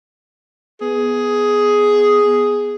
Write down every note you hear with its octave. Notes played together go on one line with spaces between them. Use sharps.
B3 G#4